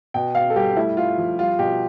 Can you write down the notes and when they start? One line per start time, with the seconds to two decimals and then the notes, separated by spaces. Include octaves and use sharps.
0.14 B2 G5
0.35 B2 F5
0.50 A4
0.56 G3 G4
0.77 A3 E4
0.97 A3 F4
1.18 F3
1.39 G3 F4
1.59 B2 G4